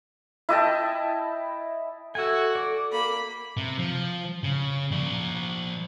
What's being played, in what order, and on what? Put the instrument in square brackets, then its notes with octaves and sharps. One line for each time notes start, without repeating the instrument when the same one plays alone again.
[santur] E4 D#5 G5 A5
[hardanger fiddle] F#4 [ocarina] A4 [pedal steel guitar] E5 G#5
[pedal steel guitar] D5
[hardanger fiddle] A#3 B5
[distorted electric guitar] C3
F3
C#3
F3 D5